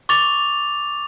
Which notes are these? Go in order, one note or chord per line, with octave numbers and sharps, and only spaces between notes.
C#6 D6 A6 F7